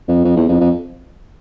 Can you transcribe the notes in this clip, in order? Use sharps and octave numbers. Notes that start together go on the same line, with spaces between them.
F2
F2
E2
F2
F2